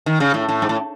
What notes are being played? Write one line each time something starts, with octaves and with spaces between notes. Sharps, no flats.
D#3
C#3
A2
A2
G#2
A2